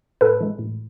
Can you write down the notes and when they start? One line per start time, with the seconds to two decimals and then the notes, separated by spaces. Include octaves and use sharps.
0.21 A2 A4 B4
0.40 E3 G#3
0.59 A2